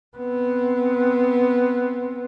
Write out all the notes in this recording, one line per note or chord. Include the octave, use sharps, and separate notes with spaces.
B3 C4